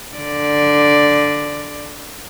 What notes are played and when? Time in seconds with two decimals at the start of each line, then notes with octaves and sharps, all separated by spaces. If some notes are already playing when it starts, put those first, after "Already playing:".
0.16 D3 D5